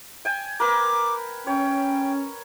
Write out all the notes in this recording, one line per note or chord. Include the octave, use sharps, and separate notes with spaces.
G5 G#5
A#4 B4 D6
C#4 C#5 G5